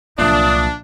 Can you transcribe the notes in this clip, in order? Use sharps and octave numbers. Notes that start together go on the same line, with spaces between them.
C2 A#2 F3 F#3 D4 E5 D#6